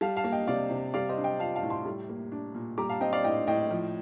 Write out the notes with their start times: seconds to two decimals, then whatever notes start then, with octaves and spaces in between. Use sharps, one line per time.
0.01 G3 F5 A5
0.17 F5 A5
0.24 A#3
0.32 D#5 G5
0.47 C3 D5 F5
0.71 C3
0.94 G3 D5 F5
1.09 C5 D#5
1.17 D4
1.24 D#5 G5
1.39 F4 F5 A5
1.56 F5 A5
1.63 A2
1.70 A5 C6
1.86 G3
2.09 A#3
2.32 D4
2.55 A#2
2.78 G3 A#5 D6
2.89 F5 A5
3.01 C4 D#5 G5
3.13 D5 F5
3.24 A2 D#5 G5
3.47 A2 D#5 G5
3.70 F3